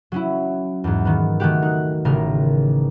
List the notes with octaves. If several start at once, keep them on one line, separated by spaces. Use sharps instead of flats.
F#3 C#4 E4
E2 G#2
D#3 B3
D#3 A3 F#4 G4
D#4 F#6
A1 C#3 A#4